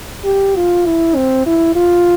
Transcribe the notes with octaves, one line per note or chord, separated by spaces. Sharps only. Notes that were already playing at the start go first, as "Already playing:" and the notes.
G4
F4
E4
C4
E4
F4